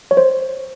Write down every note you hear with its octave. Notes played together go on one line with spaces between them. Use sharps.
C#5
C5